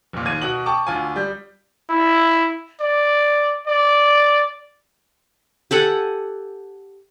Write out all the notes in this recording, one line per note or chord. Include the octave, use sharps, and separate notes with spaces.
F1 A#2
D#2 G#6 D#7
B2 F#4 F#7
G5 A5 C#6 D6
D2 F4 G#5
G3 G6
E4
D5
D5
G4 A4 F#5 G#5